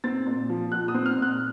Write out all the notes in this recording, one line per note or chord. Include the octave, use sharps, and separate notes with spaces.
C4 A6
A#2
F3
A#2 F#6
D#6
C4
F6
A#2
F#6